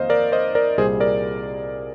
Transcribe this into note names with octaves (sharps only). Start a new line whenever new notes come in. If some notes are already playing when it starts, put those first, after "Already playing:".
Already playing: F2 D#3 A#3 C5 D#5 F5
A#4 D5
C5 D#5
A#4 D5
C2 A#2 G3 G#4 C5
A#4 D5